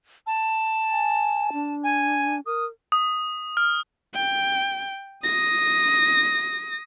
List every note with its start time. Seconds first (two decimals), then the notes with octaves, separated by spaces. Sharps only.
0.27 A5
0.91 G#5
1.53 D4
1.84 G#5
2.46 A#4 D#6
2.92 D#6
3.57 F6
4.14 G5
5.24 D#6 A#6